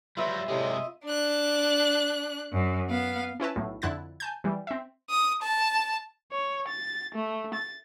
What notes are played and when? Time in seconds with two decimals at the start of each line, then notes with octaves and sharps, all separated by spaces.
0.17 F#3 G3 F4 B4 E5
0.48 A2 C3 G3 G#3 D#5
1.05 D4 F#6
2.51 F#2
2.89 B3 F5
3.40 C#4 E4 B4 A5
3.56 B1 A2
3.82 F2 D3 E4 F#6 G#6 A6
4.20 G#5 A5 G6
4.44 E3 G3
4.67 C4 E5
5.10 D#6
5.42 A5
6.32 C#5
6.68 A6
7.14 A3
7.54 A6